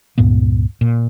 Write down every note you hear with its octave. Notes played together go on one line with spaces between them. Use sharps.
C#2 G2 A#2 B3
A#2